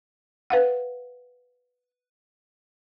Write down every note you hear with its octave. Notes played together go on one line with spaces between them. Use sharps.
B4 F5 F#5